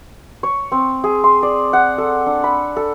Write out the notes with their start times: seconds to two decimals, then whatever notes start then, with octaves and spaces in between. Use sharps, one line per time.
0.43 C#5
0.72 C4
1.04 G#4
1.24 C6
1.43 D5
1.73 F#5
1.98 A4
2.26 D4
2.44 B5
2.76 A4